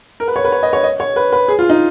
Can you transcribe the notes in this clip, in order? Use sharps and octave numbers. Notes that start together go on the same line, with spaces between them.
A#4
B4
C#5
B4
C#5
D#5
C#5
D#5
C#5
B4
B4
G#4
F4
D#4